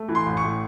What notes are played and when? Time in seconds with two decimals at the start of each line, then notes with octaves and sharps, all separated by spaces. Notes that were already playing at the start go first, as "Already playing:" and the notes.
Already playing: A3
0.09 E3
0.15 C6
0.26 A1
0.37 C#6
0.43 A2